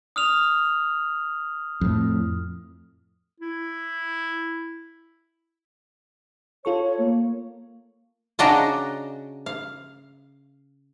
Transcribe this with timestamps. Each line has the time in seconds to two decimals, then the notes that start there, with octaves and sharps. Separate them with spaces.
0.16 D#6 F6 F7
1.81 F2 A2
3.40 E4
6.65 F4 A4 C#5 C#6
6.83 C#5
6.99 A#3
8.39 C#3 D4 F#4 D#5 G5 A#5
9.46 F5